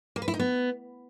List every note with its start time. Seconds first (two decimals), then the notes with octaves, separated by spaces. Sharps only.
0.16 A#3
0.22 B4
0.28 E4
0.34 D#4
0.39 B3